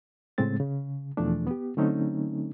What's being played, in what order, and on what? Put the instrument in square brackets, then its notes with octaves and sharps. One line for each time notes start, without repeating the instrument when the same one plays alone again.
[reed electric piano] A2 C#3 G#3 C4 A6
C#3
E2 B2 E3 F3 A3 D4
B3 G4
D3 F#3 A3 C4 C#4 D#4